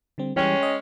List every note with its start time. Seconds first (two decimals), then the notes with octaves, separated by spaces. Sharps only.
0.18 D3 G3 C4
0.36 E3 G3 G#3 C#4 C#5 G5
0.63 D#5